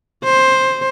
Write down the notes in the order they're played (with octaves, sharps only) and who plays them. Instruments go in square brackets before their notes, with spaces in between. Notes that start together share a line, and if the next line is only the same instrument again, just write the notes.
[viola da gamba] C5